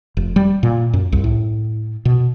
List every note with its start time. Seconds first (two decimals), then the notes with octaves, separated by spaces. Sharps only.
0.17 F1
0.36 G3
0.63 A#2
0.93 F#2
1.12 C2
1.24 A2
2.05 B2